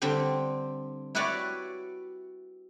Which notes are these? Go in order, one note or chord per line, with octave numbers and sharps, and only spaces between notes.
D3 G3 C4 G4
E4 F#4 G4 B4 C#5 D5